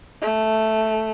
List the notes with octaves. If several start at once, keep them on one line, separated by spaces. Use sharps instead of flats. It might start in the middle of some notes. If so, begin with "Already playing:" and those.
A3